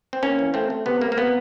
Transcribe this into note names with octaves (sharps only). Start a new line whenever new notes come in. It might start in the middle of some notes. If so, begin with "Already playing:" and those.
C4
A#3 C#4
E3
A3 C4
A3
C3 B3
C3 A#3
A#3
B3